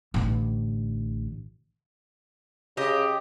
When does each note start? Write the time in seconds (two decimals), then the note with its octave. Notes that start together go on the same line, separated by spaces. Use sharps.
0.14 A1 D3
2.77 C#3 G4 D#5